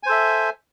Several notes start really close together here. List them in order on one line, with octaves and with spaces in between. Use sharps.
G#5 C5 A4 E5